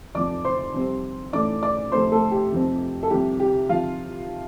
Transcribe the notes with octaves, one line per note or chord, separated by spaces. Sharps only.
F1 F2 F3 D5 D6
C5 C6
F2 C3 G3 C4
A1 A2 A3 D5 D6
D5 D6
F2 C3 A3 C4 C5 C6
A3 A4
G4
F1 F2 F3 C4
A4
C2 C3 F3 G4
G4
C3 F3 F4 F5